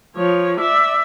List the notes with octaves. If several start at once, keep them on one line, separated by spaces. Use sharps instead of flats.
F3 C#5
D5 E5